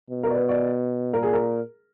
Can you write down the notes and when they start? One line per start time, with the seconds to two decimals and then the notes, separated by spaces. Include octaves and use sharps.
0.10 B2
0.23 A#4
0.30 D5
0.35 B4
0.49 D5
1.13 A#2 A#4
1.23 G#4
1.33 A#4